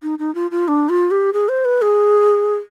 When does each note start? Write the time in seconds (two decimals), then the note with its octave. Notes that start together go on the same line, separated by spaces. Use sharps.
0.03 D#4
0.19 D#4
0.35 F4
0.51 F4
0.68 D4
0.89 F4
1.11 G4
1.33 G#4
1.49 C5
1.65 B4
1.82 G#4